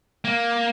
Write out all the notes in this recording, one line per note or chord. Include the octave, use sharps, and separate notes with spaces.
A#3